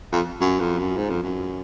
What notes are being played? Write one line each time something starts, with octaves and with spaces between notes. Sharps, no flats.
F2
F#2
F2
F#2
G#2
F2
F#2